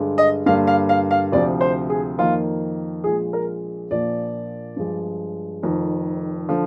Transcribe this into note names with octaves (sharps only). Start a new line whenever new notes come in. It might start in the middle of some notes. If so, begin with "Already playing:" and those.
Already playing: G2 D3 G#3
D#5
G2 D3 G3 A#3 F5
F5
F5
F5
D2 C3 F3 D5
C5
G#4
F2 D#3 A#3 F4
A#1 A#2 G#3 G#4
A#4
A#1 A#2 F3 A#3 D5
G2 F3 G#3
F1 F2 D#3
D3 F3